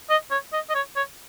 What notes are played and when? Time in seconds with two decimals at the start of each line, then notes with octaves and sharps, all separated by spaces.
0.10 D#5
0.31 C#5
0.53 D#5
0.69 D#5
0.75 C#5
0.96 C#5